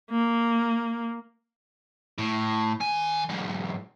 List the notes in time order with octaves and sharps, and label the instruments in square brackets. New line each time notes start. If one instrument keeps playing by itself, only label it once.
[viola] A#3
[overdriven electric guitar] A2
D#3 G#5
B1 G#2